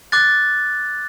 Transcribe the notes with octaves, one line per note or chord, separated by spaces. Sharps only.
D6 F#6 A6